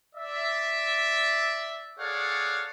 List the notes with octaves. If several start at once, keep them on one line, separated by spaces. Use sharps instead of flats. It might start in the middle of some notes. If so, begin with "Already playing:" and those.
D5 E5
G#4 A4 C#5 D5 F5 F#5